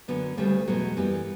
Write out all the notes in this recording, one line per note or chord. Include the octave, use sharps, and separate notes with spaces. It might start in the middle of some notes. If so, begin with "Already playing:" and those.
F#2 D3 F#3 B3
D2 C#3 G3 A3
E2 B2 F#3
F#2 E3 G3 B3